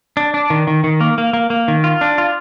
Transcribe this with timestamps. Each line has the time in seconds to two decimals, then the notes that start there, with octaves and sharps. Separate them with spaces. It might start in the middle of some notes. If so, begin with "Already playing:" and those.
0.17 D4
0.34 D4
0.50 D#3
0.67 D#3
0.84 D#3
1.01 A#3
1.18 A#3
1.33 A#3
1.50 A#3
1.68 D#3
1.84 F4
2.01 D4
2.18 F4